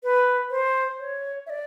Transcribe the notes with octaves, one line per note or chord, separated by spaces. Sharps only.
B4
C5
C#5
E5
D5